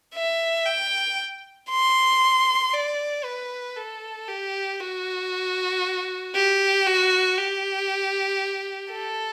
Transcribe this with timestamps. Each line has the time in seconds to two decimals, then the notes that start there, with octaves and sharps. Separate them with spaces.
0.15 E5
0.66 G5
1.70 C6
2.74 D5
3.25 B4
3.76 A4
4.29 G4
4.80 F#4
6.35 G4
6.87 F#4
7.38 G4
8.92 A4